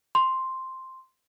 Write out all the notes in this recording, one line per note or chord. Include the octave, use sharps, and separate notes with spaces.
C6